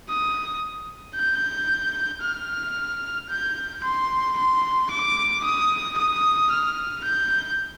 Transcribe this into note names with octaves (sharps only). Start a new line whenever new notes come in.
D#6
G6
F6
G6
C6
C6
D6
D#6
D#6
F6
G6